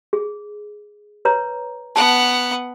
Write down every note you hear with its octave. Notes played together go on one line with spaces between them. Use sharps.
G#4
B4 C#5 A#5
B3 F#5 A5